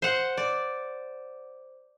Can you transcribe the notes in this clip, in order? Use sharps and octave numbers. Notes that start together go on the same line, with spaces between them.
C5 F#5
D5